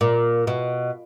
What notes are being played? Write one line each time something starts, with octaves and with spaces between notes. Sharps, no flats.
A#2
B2